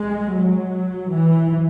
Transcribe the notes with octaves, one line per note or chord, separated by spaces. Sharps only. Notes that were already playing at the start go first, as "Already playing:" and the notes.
Already playing: G#3
F#3
E3